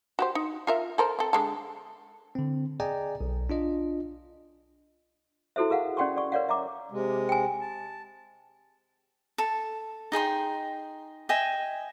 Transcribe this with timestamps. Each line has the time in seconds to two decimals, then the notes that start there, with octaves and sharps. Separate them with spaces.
0.19 F#4 G4 C5
0.35 D#4
0.67 F4 A#4 E5
0.98 A4 A#4 C5
1.19 C4 A4
1.33 D3 G#3 A4
2.35 D3 C4
2.80 G#4 D5 D#5 G5 G#5 A#5
3.21 B1
3.50 D4 F4 D#5
5.56 E4 F#4 A4 C5 E5
5.70 G#4 A#4 F5 F#5
5.97 C#4 D5 F#5 G5 C6 C#6
6.16 D5 C#6
6.32 A#4 C#5 D5 F5 F#5
6.49 E5 A#5 D6
6.91 C3 G#3
7.29 G5 G#5
7.61 A5
9.38 A4
10.12 D#4 G#4 G5 C6
11.29 D#5 E5 G5 G#5